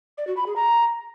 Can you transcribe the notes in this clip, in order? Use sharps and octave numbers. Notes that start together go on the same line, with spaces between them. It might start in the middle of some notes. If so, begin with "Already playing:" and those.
D5
F#4
B5
G#4
A#5